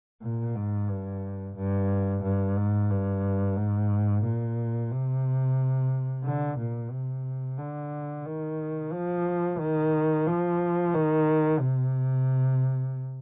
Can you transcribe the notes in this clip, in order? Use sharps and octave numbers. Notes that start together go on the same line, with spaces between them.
A#2
G#2
G2
G2
G2
G#2
G2
G#2
A#2
C3
D3
A#2
C3
D3
D#3
F3
D#3
F3
D#3
C3